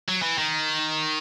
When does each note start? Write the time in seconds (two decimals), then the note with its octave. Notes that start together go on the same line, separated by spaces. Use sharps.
0.08 F#3
0.22 E3
0.38 D#3